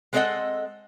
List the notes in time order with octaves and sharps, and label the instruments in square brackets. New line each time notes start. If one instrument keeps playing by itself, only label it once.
[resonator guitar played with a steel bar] G#3 B3 C4 A4 D#5 F#5